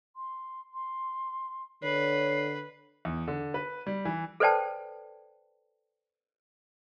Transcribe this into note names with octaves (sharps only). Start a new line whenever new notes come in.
C6
C6
D3 B4 C#5 C7
E2
D3
B4
G3
E3
A4 B4 C5 D5 G5 A5